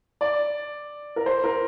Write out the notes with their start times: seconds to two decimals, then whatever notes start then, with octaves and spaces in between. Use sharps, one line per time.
0.21 D5
1.16 A#4
1.26 C5
1.44 A#4